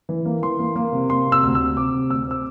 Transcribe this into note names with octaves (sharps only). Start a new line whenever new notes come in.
E3
A#3
E3 C6
A#3
A#3
C3
A#3 C6
C3
E6
D2
C3 E6
C3 D6
C3
D2 E6
C4 E6